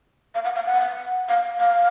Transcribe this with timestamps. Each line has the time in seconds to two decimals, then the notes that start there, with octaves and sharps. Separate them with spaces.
0.35 F5
0.44 F#5
0.56 F5
0.65 F#5
1.29 F5
1.60 F5